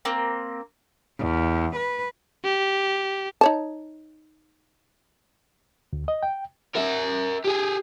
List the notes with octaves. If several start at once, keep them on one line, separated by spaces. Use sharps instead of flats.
A#3 C4
E2
B4
G4
D#4 C#5 A5
D2
D#5
G5
A#4 E5
G4 G#4